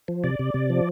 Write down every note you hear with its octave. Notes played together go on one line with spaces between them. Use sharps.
F3
C3 D5
C3
C3
F3